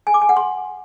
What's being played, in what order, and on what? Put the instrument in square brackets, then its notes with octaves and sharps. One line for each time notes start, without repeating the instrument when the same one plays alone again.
[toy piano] G#5
D6
G#5
F#5
C6